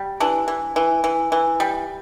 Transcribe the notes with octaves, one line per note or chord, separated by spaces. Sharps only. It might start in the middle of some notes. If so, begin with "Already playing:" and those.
Already playing: G3
E3 D4
E3
E3
E3
E3
G3